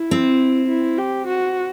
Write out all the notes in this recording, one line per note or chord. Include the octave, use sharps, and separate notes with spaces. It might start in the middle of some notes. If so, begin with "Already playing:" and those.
Already playing: E4
C4
E4
G4
F#4